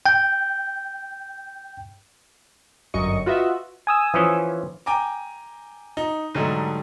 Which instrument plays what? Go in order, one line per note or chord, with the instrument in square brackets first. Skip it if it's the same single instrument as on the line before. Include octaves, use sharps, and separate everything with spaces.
[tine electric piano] G5 G6
[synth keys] G1 F#2 D#5 C#6 C#7
F4 F#4 B4 D#5 E5
[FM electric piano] G#5 D#6 E6
[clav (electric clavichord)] E3 F3 C#4
[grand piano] G5 G#5 A#5 D6
D#4
G#2 D3 F#3 G3 A3 D#4